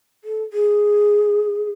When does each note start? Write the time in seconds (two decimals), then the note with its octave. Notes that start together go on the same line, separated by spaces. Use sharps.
0.24 A4
0.53 G#4